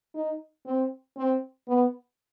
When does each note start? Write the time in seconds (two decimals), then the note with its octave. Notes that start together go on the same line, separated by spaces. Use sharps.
0.15 D#4
0.66 C4
1.17 C4
1.68 B3